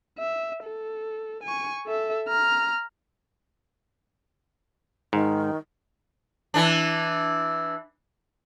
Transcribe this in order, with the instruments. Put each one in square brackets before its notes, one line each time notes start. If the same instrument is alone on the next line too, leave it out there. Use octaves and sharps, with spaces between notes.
[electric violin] E5
A4
G#5 C#6
A4 E5
A#5 F6
[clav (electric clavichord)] G#2 [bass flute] D#3
[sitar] E3 D4